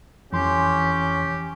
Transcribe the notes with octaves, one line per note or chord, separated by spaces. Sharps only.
F2 E3 C#4 G4 C6